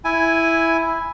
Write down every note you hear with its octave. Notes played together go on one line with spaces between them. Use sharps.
E4 G#5